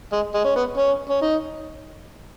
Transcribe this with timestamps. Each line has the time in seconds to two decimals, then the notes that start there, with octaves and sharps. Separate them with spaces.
0.12 G#3
0.34 G#3
0.44 C#4
0.56 B3
0.77 C#4
1.09 C#4
1.22 D#4